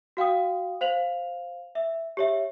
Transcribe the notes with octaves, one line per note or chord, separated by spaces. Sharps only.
F#4 F5 G5 D#6
C5 F5 F7 F#7
E5
G4 C#5 E5